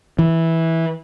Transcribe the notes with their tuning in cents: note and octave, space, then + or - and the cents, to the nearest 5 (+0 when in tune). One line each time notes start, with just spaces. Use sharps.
E3 -10